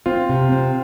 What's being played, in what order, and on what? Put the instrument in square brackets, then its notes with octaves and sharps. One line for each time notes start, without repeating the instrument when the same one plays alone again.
[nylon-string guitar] C4 [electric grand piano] F4
[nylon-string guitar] C3
C4